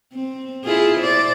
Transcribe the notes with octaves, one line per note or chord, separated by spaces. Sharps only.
C4
E4 F4 G#4
C5 D5